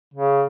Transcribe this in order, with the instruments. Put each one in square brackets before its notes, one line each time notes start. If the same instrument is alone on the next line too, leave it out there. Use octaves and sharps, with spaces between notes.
[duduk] C#3